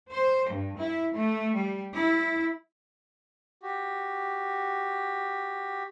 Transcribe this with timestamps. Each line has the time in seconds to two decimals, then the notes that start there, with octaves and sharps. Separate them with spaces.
0.11 C5
0.48 G2
0.78 E4
1.14 A3
1.54 G3
1.96 E4
3.63 F#4 G4